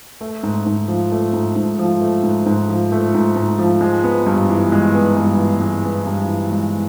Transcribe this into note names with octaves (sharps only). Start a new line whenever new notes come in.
A3
G#2
G#2
F3
A3
G#2
G#2
F3
A3
G#2
G#2
F3
A3
G#2
G#2
F3
G#3
B3
G2
E3
G#3
B3
G2
E3
G#3
B3
G2
E3
G#3